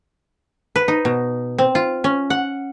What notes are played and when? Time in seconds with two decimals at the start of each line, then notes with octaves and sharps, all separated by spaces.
0.76 B4
0.88 D#4
1.05 B2
1.58 C4
1.75 F4
2.04 C#4
2.30 F#5